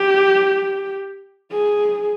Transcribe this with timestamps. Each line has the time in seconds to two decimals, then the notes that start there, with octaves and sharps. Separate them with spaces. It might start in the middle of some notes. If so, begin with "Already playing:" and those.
Already playing: G4
1.51 G#4